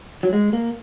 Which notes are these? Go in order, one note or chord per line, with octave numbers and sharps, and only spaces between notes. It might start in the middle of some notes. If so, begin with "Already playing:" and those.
F#3
G#3
A#3